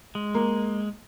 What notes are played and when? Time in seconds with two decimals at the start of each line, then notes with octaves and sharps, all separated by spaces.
0.15 G#3
0.34 A#3